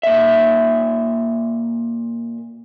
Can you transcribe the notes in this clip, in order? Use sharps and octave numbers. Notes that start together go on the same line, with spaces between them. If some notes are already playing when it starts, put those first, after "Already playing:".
A#2 E5